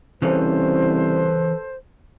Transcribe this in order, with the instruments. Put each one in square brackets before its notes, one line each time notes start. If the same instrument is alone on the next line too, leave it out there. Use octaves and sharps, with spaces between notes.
[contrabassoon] C2 [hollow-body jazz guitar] C#3 E3 C#4 [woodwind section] A4 B4 C5